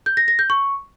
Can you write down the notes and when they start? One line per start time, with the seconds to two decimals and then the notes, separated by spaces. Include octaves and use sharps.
0.06 G6
0.17 A#6
0.28 A#6
0.39 G6
0.50 C#6